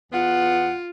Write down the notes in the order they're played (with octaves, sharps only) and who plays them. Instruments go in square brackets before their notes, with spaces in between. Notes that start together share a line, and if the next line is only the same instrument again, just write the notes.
[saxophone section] E2 B3 F#5 [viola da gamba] F4